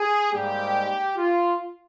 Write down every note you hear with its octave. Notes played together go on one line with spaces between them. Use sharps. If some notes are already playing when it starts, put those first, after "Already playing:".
Already playing: G#4
G#2 G3 A#3 G4
F4